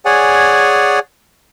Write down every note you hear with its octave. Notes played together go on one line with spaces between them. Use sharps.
G#4 C#5 D5 F#5 G#5